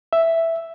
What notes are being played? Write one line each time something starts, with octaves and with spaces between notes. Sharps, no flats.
E5